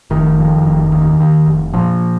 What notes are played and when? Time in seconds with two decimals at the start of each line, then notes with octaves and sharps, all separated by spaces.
0.10 F1 D#3
0.38 F2
0.65 F1
0.92 D#2
1.20 D#2
1.46 F1
1.74 A#2 F3